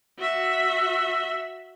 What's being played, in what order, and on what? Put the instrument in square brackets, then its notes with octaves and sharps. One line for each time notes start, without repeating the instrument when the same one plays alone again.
[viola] F#4 E5